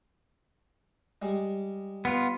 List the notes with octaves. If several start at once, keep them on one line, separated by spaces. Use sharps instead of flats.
G3 G#3
B3 F4